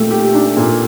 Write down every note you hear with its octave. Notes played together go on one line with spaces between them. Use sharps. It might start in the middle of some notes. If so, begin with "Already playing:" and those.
Already playing: A#2 A3 G4
G4
D4
A#2